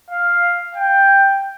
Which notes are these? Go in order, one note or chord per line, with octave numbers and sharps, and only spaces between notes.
F5
G5